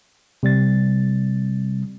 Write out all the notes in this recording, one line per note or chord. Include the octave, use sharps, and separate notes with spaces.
C3 G3 A6